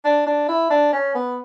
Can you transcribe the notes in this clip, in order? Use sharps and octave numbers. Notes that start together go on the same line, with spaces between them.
D4
D4
E4
D4
C#4
B3